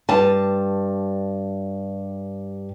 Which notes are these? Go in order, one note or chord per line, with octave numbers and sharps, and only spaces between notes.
G2 A5